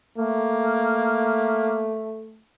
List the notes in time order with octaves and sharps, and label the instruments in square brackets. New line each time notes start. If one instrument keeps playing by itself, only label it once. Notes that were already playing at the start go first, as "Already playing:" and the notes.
[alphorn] A3 [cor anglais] A#3